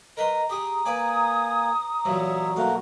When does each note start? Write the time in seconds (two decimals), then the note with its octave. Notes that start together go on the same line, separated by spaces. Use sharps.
0.17 A#4 B4 D#5 A#5 C6
0.49 G4 G#4 D#6
0.85 A#3 B4 D5 G#5
2.05 A1 A#2 F#3 C#5 E5
2.56 B1 A3 A#3 F#4 F5